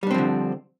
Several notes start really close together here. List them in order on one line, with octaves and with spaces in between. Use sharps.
G3 D4 C4 F3 D3